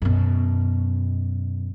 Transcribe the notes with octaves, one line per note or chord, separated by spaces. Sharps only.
F#2 B2